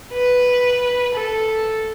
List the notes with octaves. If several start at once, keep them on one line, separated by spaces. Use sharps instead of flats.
B4
A4